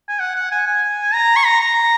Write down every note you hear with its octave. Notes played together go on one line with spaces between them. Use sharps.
G#5
F#5
F#5
G#5
G#5
A#5
C#6
A#5
A#5